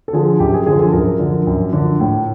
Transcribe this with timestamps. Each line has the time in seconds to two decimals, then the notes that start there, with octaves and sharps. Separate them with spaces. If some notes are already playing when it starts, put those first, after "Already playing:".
0.08 A4
0.13 D3 F3 G#4
0.40 F#2 G4
0.54 G#4
0.67 D3 F3 G#4
0.79 A4
0.93 F#2 A#4
1.19 D3 F3
1.47 F#2
1.73 D3 F3
2.00 A2